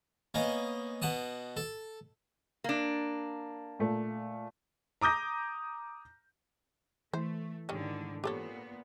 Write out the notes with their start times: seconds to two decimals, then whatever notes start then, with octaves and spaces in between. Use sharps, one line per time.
0.34 A#3 B3 C#4 D#5
1.02 B2 F#5 A5 D#6
1.57 A4
2.64 A#3 D4
3.79 A#2 A3
5.01 A#5 D6 D#6 G6 A#6
7.13 E3 A3 C5
7.69 G#2 D3 D#3 G3 C#4
8.24 A#2 B3 G4 A4 C#5